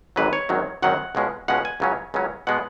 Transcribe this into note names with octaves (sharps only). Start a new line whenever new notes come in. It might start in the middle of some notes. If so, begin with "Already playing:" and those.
G#1 G#2 F#3 B4
C#5
G#1 F#2 D#3 F#3
G#1 F#2 D#3 F#3 F#5
C#2 B2 G#3 C#4
C#2 B2 G#3 C#4 F#5
G#5
C#2 C#3 F#3 C#4
C#2 C#3 F#3 C#4
B2 G#3 B3 F#5